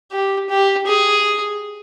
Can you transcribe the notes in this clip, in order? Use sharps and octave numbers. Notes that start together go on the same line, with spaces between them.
G4
G4
G#4